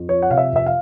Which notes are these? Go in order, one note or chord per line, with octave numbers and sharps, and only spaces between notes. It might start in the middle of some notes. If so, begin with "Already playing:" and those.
Already playing: F2
F3 C#5
F#5
C3 F5
E5
F2 E5
F5